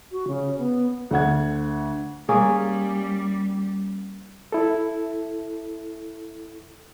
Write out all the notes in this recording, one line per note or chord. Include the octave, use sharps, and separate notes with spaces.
F#4
C#3
B3
D2 D4 F#5 G#6
G3 A#3 C#4 G#4
E4 A4